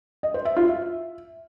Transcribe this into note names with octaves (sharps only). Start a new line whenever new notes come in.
D#5
C5
E5
F4
E5